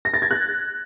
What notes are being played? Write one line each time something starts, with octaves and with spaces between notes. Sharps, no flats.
A#6
A6
G#6
F#6